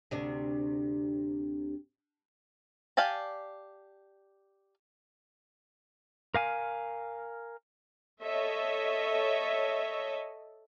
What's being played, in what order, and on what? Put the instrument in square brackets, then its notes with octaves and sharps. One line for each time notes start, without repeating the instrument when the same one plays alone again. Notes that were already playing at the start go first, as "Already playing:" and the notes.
[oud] D2 C3 D4
[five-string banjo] G4 D5 F5 G#5 A5
[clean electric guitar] A#4 F5 G#5
[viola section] A4 C#5 D#5 E5